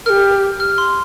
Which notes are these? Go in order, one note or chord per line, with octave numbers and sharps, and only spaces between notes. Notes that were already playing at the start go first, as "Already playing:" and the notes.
G4 A#4 F6
F6
C6